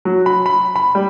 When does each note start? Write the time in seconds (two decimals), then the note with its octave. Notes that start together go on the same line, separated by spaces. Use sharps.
0.05 F#3
0.26 B5
0.46 B5
0.76 B5
0.95 G3